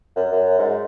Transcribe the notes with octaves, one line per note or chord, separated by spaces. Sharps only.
F#2
F#2
G#2